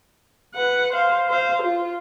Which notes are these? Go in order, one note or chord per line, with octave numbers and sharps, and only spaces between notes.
B4 F#5
C5 F5
C5 F5
F4